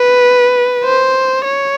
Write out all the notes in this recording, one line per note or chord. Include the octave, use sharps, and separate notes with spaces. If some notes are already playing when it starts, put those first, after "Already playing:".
Already playing: B4
C5
C#5